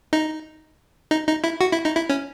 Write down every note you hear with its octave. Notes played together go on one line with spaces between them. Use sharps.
D#4
D#4
D#4
E4
F#4
E4
D#4
E4
C#4